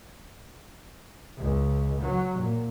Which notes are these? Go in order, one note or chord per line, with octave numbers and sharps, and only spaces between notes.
C#2
F#3
A#2